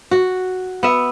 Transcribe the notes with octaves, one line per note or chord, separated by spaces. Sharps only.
F#4
B3 E5